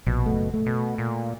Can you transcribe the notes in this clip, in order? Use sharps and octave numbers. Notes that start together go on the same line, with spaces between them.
A#1 B2
F#1 A3
A3
B2
A#2